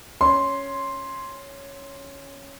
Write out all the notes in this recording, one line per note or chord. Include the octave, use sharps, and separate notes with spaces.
C#4 C6